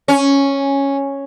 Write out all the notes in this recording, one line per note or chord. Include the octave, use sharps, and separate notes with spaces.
C#4